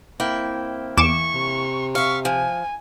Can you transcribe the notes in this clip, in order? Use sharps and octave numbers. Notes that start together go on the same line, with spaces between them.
A#3 C4 E4 G5
E2 C#6 D6 E7
C3
E5 F5 C#6
F3 G#5